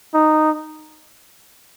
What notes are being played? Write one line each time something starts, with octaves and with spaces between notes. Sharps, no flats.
D#4